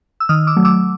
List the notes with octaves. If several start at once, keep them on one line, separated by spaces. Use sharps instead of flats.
E6
D#3 D#6 F6
D6 E6
F#3 A3
D6 E6